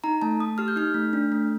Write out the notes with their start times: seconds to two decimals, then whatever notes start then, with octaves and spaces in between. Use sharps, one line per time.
0.04 D#4 A#5
0.21 A3 A5
0.40 A3 D#6
0.58 G4 F6
0.68 G6
0.76 D#4 F6
0.94 A3
1.13 D4
1.32 A3